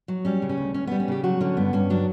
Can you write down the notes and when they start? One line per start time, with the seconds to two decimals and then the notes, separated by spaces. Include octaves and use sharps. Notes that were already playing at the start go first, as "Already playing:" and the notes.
0.08 F#3
0.25 G3 C#4
0.42 C#3
0.49 C#4
0.58 D2
0.74 D2 C#4
0.87 G3 B3
1.00 C#4
1.08 C#3 G4
1.24 F#3 F#4
1.41 D3 C#4
1.57 G2 B3
1.73 G2 C#4
1.90 F#3 D4